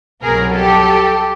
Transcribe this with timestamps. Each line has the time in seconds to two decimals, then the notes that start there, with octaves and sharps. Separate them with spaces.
0.23 C2 B2 F#3 G#4 A#4
0.53 G4 A4